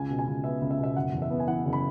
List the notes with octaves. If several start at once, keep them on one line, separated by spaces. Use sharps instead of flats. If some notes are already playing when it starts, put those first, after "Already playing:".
Already playing: C#2 G#5
B2
G#5
C#2
B3 E5
C#2
E5
B2
E5
F#1 F#5
E2
E5
B3
G#5
E3 F#5
F#1
B5